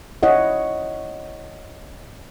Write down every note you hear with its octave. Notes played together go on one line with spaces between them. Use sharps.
E4 C#5 D#5 F#5